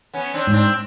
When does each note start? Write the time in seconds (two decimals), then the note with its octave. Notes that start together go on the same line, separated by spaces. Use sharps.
0.13 B3 C#4
0.34 C4 D4
0.47 G#2
0.54 C4 D4